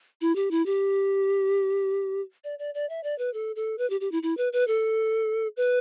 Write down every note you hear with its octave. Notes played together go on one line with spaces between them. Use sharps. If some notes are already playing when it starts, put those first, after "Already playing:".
E4
G4
E4
G4
D5
D5
D5
E5
D5
B4
A4
A4
B4
G4
G4
E4
E4
B4
B4
A4
B4